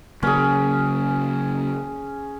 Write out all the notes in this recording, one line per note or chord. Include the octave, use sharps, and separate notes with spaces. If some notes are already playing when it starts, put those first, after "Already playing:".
C#3 F#3 A#3 C#4 G#4